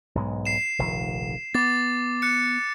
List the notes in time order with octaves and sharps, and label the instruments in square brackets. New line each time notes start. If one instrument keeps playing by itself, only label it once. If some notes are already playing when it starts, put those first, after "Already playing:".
[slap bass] B1 G#2 G#3
[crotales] C7 E7
[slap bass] F1 A#1 D#3
[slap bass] B3 [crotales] D6 A6
[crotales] F#6 C#7